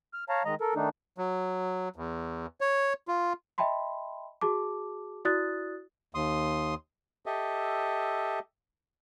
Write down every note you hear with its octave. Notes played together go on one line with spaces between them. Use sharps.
F6
C#5 F5 A5 A#5
D#3 G#3 D#5 A#5
A4 A#4
D#3 A3 D4 D#4
F#3
E2
C#5
F4
D#5 E5 G5 A5 B5 C6
F#4 G#4 A5 D6
E4 F#4 D5 D#6 F#6 A6
D#2 C6 D#6
G4 A4 D#5 E5